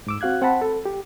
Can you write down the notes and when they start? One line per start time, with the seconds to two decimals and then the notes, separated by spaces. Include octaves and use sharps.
0.07 G#2 D6 E6
0.21 C4 F#4 F5 F#6 G#6
0.42 C4 F#5 A5 B5
0.61 A4
0.85 G4